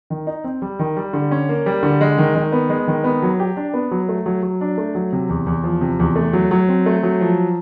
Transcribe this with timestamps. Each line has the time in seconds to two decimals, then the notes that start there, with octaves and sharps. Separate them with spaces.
0.10 D#3
0.27 D#4
0.44 C4
0.62 G3
0.79 D#3
0.97 G3
1.13 D3
1.31 C#4
1.49 A#3
1.66 G3
1.83 D3
2.01 G#3
2.18 D#3
2.35 D#3
2.52 B3
2.69 G#3
2.87 D#3
3.04 B3
3.22 F#3
3.39 G4
3.57 D4
3.74 B3
3.91 F#3
4.09 A3
4.26 F#3
4.43 F#3
4.61 D4
4.78 A3
4.95 F#3
5.13 C3
5.29 E2
5.47 E2
5.64 F3
5.81 C3
6.00 E2
6.16 A3
6.33 F#3
6.51 F#3
6.69 C4
6.86 A3
7.03 F#3
7.21 F3